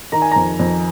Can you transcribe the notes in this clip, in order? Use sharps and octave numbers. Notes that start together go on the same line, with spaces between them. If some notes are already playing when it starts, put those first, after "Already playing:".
D#3 A#5
G#5
F2 A#5
F2